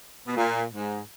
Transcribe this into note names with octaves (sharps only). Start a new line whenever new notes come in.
B2
A#2
G#2